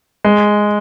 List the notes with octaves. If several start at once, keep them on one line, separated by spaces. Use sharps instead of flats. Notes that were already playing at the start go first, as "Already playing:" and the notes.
G#3